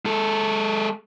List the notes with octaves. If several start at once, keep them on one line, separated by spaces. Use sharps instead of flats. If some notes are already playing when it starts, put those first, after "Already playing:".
G#3 A4